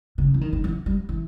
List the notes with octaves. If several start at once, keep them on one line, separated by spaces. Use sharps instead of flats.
C#3
E3
D#3
D#3
E3
G3
E3